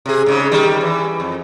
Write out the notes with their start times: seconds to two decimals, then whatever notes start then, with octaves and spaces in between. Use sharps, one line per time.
0.06 C3 G#4
0.26 G#2 C#3
0.51 D#3 G3
0.81 E3
1.20 F2